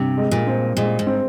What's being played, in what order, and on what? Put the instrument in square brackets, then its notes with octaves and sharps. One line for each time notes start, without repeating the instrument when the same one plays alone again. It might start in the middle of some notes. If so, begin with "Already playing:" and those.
Already playing: [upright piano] G2 [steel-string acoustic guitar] C3
[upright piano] G#3
[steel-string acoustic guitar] A#2
[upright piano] C4
[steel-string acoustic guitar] A#2 [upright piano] G#3
[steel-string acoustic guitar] G#2
[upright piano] C4